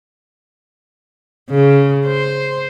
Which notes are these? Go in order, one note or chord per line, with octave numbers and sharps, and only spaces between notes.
C#3
C5